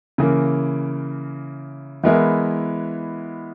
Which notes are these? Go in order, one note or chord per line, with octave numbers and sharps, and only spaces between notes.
C#3 E3 A#3
E3 G#3 B3 E4 A#4